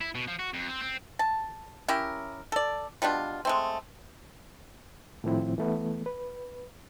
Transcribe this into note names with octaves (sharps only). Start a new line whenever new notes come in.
E4
B2
F3
F#4
F2
C4
C4
A5
C#4 E4 G4 A#4
A4 D5
B2 G3 D4 F4
G#3 A3 C4
A2 D#3 F3 C4 E4
E3 A3 B3
B4